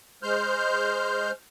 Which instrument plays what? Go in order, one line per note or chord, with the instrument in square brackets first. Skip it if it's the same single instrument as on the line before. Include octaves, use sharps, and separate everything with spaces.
[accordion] G#3 C5 F6 G6